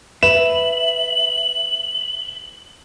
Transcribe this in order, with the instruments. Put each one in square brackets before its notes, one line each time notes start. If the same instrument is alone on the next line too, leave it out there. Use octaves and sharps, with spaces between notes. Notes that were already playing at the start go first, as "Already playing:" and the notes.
[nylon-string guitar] B4 [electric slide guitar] E5 [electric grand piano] E7 [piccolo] F#7